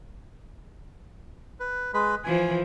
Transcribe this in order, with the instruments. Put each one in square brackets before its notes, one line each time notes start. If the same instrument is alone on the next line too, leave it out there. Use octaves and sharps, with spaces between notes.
[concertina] B4
G#3 B4 B5
[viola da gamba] E3 F3 [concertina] G#5